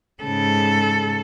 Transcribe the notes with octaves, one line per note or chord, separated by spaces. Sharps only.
G#2 C#3 A4